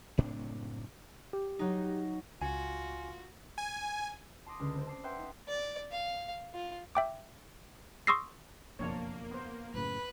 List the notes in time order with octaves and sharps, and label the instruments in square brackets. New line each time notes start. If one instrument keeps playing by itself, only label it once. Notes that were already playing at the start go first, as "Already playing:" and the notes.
[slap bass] F#1 A2 C4 D4
[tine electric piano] G4
[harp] F#3 D#4
[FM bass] C#2 [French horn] F4 [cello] F#4 [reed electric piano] G#5
[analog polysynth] G#5
[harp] A5 C6 D6 D#6 A#6
C#2 D3
C4
A5 D6 C7
B4 E5 F#5 G5 C6
D#4
[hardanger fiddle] D5
F5
F4
[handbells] E5 G5 D6
C6 C#6 D#6 E6 A#6 C7
[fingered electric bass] F#1 F2 B2 [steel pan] F3 D4 C#5 [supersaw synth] A#3
[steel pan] B3 C5
[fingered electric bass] F#2 A2 C#3 [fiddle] B4